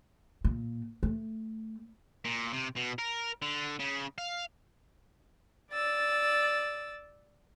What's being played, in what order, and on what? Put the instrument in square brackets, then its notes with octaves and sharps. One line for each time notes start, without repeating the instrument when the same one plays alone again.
[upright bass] A#2
A3
[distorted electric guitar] A#2
C3
B2
A#4
D3
C#3
F5
[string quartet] D5 E6 A6